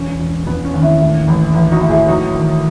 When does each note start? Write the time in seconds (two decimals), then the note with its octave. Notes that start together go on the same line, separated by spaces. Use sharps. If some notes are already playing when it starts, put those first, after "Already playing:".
Already playing: E1 C#4
0.20 E1
0.47 E1 B3
0.65 C#4
0.74 D#2
0.82 C#4 E4
1.00 A2
1.28 A1
1.54 A1
1.72 D#4 F#4
1.81 A2
1.90 E4 G#4
2.08 F#3 D#4 F#4
2.35 D#3